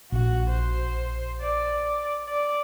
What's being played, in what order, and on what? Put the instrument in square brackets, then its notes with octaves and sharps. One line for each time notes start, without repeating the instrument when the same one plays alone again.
[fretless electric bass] A#1 [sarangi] F#4
[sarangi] C5
D5
D5